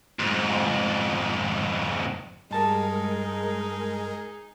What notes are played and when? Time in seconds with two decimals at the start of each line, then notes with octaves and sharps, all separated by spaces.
0.19 F2 G#2
2.51 G2 G#3 D#4 G#4 A#4 A5